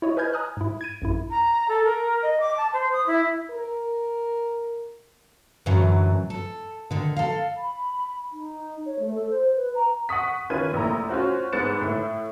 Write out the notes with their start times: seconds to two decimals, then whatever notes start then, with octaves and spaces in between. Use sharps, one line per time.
0.02 E4 C#5 D#5
0.17 B4 D#5 G#5 F6 G6 G#6
0.33 G#5 A#5 D#6 F6 F#6
0.57 G#2 E4
0.81 G#6 D7 D#7
1.02 A#1 F#2 E4
1.30 A#5
1.68 A4
1.85 A#4
2.23 D#5
2.40 D6
2.58 A5
2.73 C5
2.93 D#6
3.07 E4
3.51 A#4
5.66 F#2 A2 D3 E3 F#3
6.30 A4
6.91 D3 D#3
7.17 A4 F5
7.57 B5
8.33 D#4
8.86 C#5
8.99 A3
9.15 A4
9.30 C5
9.56 B4
9.75 A#5
10.09 F#5 C#6 D#6 B6
10.50 D#3 C#4 F4 B4 G#6 D#7
10.72 F1 A#1 E4 A#5
11.09 C#4 F4 F#4 C5
11.53 G#2 B3 F#6 A6 C#7 E7
11.81 A2 E4